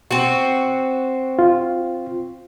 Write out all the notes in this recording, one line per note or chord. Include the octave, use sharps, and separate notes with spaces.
C4 F#4
F4